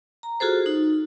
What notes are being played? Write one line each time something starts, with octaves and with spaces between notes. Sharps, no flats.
A#5
F4 F#4 G#4 A4 C5
D#4